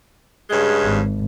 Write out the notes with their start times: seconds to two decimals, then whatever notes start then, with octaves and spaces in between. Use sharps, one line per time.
0.49 G2 C#3 G#3
0.84 G#1